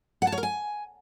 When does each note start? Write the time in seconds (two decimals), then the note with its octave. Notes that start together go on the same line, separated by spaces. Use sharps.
0.22 F#5
0.27 A5
0.32 C#5
0.38 A#4
0.43 G#5